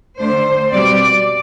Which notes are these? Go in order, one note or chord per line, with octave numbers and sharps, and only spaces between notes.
D3 A3 D4 C5
B2 G3 C4 D5